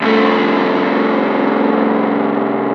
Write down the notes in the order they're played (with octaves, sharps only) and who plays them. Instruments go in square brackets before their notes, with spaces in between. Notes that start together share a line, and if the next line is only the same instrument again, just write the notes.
[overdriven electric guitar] C2 A3